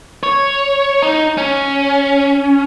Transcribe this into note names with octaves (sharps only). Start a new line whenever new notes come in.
C#5
D#4
C#4